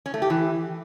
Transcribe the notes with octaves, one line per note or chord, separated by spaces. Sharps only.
C#4
A3
G4
E3